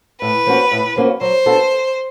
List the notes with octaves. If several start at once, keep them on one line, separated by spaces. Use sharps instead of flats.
A2 B4
F3 A#3 C#4 F#4
A2
F3 A#3 C#4 F#4
F#3 C5
B3 D4 F#4 A4